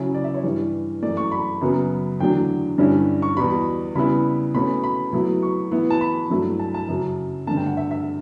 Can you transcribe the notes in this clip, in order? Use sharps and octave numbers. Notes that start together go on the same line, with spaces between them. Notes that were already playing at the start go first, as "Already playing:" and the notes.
Already playing: C#3 F#3 C#4 E4
D5
E5
C#5
G2 E3 G3
F#2 E3 A3 D5
C#6
B5
F#2 C#3 F#3 B3
E2 D3 F#3 A3 D4 G5
G2 D3 G3 C#4 E4
C#6
E2 B2 G3 B5
C#3 G3 B3 E4 B5
B2 A3 C#4 B5
B5
B2 F#3 A3 E4
C#6
A2 E3 B3 E4
A5
B5
G2 F#3 A3 E4
A5
A5
F#2 C#3 F#3
G2 D3 A3 A5
G5
F#5
E5
E5